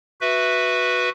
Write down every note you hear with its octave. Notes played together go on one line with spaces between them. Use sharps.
F#4 B4 E5